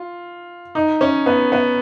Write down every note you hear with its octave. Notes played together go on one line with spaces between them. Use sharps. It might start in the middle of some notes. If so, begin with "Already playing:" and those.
Already playing: F4
D#4
C#4
B3
B3